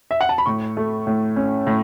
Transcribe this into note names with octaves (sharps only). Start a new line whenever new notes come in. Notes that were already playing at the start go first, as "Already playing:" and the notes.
E5
F#5
A5
B5
A2 C#6
A3
A2
C#4
A2